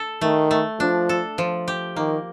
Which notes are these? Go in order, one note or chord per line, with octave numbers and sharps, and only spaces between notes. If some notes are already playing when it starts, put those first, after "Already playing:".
Already playing: A4
D#3 A3
A3
F3 D4
A4
F3
G4
D#3 A#3